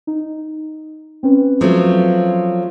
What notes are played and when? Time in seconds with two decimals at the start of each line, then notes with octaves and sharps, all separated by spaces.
0.07 D#4
1.23 C4 C#4 B4
1.61 F3 F#3 A3